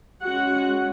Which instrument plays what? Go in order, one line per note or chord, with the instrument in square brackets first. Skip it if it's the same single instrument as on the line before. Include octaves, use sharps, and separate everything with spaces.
[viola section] G#3 C#4 F#4 F#5